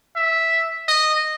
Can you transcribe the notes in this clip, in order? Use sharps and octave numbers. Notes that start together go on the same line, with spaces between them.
E5
D#5